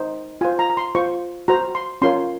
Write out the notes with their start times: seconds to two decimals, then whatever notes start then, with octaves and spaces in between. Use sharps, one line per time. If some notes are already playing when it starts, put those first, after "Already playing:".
Already playing: D#4 C5
0.41 F4 C5 G#5
0.59 A#5
0.70 A#5
0.77 C6
0.95 F4 C5 C#6
1.48 F#4 C5 A#5
1.75 C6
2.02 C#4 F4 A#4 C#5 C6